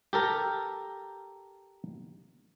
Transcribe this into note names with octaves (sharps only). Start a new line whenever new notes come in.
G4 A4 A#4